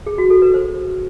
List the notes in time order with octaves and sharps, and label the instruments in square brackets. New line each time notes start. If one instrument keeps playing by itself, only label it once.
[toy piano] G#4
F#4
A4
B4
C5